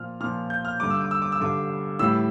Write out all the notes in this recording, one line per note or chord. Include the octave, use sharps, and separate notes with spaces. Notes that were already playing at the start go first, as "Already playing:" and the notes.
Already playing: A#2 F3 F6
A#2 F3 F6
G6
F6
G2 D3 G3 D6
E6
D6
E6
D6
E6
G2 D3 G3 D6
A2 E3 G3 E6